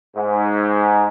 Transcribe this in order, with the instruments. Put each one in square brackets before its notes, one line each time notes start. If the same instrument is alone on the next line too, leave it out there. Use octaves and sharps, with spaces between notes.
[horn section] G#2